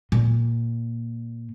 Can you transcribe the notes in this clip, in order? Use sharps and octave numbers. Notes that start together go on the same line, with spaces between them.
A#2